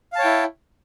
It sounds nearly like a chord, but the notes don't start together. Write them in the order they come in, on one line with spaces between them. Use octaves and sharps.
F5 A5 C#5 G5 E4